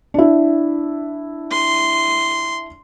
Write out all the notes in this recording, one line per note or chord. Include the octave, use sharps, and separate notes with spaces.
D4 E4
C6